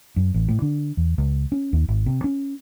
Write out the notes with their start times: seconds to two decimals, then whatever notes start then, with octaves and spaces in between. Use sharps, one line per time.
0.16 F#2
0.34 A1
0.49 A2
0.62 D3
0.97 E2
1.18 C#2
1.52 C#4
1.73 D#2
1.88 G#1
2.06 C3
2.24 C#4